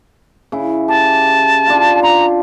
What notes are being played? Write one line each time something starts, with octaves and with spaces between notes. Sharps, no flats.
C#3 E4
G4 A5
D4 F4
A#5 C6